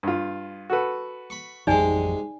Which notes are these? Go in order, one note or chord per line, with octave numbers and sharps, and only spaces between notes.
G2 F4
F#4 A4 B4
B5 C#6
A1 F2 C3 F#3 G#3 D#4 D5 G#5